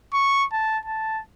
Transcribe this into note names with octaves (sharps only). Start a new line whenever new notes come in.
C#6
A5
A5